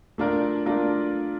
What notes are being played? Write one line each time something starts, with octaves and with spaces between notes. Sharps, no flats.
A3 D4 F4 A#4 D5
A3 D4 F4 A#4 D5